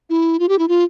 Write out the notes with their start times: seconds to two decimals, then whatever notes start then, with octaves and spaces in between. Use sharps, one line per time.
0.10 E4
0.39 F4
0.49 G4
0.59 E4
0.68 F4